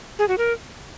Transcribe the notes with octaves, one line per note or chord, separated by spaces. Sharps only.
G#4
F#4
A#4